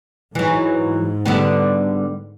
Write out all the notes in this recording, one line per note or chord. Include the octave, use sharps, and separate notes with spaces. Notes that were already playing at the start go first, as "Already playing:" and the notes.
G#2 E3 F#3
D3 G3 B3